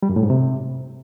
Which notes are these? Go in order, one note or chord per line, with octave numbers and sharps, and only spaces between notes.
G3
F#2
A2
G#2
C3